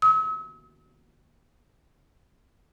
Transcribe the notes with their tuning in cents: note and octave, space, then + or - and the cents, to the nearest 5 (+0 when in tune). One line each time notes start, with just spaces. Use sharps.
E6 -45